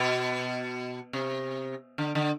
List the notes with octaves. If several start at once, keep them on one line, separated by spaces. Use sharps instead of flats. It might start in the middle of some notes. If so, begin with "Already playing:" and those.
Already playing: B2
C3
D3
D3